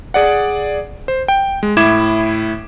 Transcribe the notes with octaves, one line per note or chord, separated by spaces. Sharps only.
G#4 D5 F#5
C5
G5
G#3
A2 E4 D6 G#6 E7